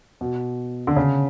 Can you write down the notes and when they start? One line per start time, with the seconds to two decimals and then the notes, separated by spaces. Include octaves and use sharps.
0.21 B2
0.87 D3
0.96 C#3